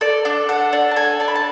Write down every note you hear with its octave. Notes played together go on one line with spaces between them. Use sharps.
A4 D5
D4
A4 F#5
D4
A5
A4 G#5
D4 A5
B5
A5